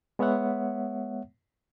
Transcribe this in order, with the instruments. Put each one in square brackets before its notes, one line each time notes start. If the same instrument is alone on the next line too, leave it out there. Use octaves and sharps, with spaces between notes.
[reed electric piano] G#3 B3 C#5 E5 F#5